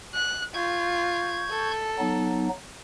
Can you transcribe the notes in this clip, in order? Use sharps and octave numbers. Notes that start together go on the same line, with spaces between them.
F#6
F4 C#6 G6 G#6
A4
F#3 B3 D#4